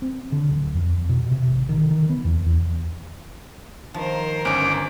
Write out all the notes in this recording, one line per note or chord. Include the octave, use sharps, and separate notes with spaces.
C4
D3
D1
F2
B2
C3
G#1
D#3
D#3
B3
E2
E2
D#3 F3 A#4 C5
G1 C#4 D#4 D6